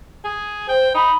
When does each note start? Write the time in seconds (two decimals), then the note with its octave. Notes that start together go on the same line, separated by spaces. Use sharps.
0.24 G#4
0.68 C5 G5
0.94 D#4 B5